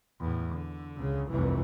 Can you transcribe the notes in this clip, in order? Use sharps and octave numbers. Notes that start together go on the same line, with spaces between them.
E2 A2
D3
C#2 C#3
F1 C2 G2 C3 E3